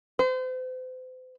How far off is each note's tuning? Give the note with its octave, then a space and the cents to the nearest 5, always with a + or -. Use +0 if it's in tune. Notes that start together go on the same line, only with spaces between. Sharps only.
C5 -40